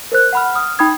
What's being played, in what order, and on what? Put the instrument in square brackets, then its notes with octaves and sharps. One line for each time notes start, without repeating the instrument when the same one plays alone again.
[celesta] A#4 C5 F#6
F#5 B5 F6
D#6 F6
D#4 G5 B5 D#6 G#6